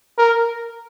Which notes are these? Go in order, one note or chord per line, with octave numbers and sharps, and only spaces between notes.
A#4